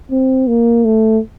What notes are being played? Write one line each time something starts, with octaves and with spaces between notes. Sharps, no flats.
C4
A#3
A3